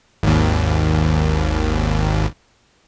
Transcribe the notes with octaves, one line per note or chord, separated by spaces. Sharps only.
G#1 D#2